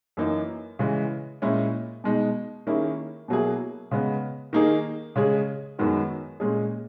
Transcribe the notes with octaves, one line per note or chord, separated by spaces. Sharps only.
F#2 E3 A#3 D#4
C#3 E3 G#3
A#2 G#3 C#4 E4
B2 G#3 D#4
D#3 A#3 C#4 E4 G#4
B2 F#3 A#3 E4 G#4
C#3 G#3 B3
D#3 A#3 D#4 G#4
C#3 G#3 C#4 G#4
F#2 D#3 G#3 B3 F#4
A#2 G#3 C#4 G#4